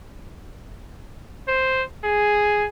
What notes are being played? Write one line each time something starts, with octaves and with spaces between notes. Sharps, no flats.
C5
G#4